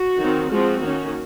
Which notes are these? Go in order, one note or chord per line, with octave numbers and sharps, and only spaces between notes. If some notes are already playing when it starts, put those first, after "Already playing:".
Already playing: F#4
D#3 F#3 C4
F3 G#3 C4 F#4
D#3 A#3 C#4